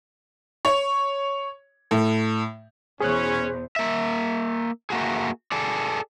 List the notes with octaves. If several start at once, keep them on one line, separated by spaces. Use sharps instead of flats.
C#5
A2
E2 B2 C#4 G#4 C5 C#5 C#6 F#6
A#3 E5
A3 A#3 F#4 G#4
G#4 A4 D5